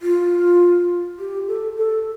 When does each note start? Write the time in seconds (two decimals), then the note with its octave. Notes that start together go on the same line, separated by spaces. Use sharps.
0.02 F4
1.19 G4
1.48 A4
1.77 A4